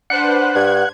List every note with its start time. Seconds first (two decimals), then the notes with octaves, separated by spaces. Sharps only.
0.10 D4 B4 C5 F#5 F#6
0.55 G2 G#6